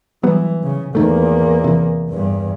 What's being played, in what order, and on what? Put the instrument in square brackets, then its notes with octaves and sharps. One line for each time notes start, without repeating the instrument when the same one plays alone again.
[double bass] E3 [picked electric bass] F#3 G3 B3
[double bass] C#3
[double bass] E2 A#3 [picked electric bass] G#2 D#3 A3
[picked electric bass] C3 E3
[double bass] E2 G2